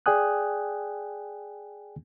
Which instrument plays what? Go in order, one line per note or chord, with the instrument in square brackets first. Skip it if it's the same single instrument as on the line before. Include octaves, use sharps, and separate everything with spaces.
[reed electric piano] G#4 D5 G5 G#5 D#6 F#6